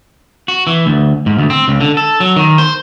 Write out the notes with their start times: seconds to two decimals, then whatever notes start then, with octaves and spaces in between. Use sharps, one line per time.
0.48 F#4
0.67 E3
0.86 D2
1.26 G#2
1.38 D2
1.50 C4
1.68 C#2
1.81 D3
1.97 A4
2.20 F#3
2.36 D#3
2.58 C5